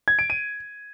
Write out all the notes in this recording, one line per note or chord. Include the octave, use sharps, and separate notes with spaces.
G#6
D7
D#7